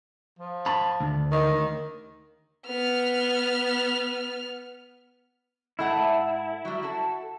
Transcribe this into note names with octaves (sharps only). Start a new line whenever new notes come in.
F3
A5 B5
D2
D#3
B3 F6
G#2 A3 E4 F#5
F#3 G3
F#4 A4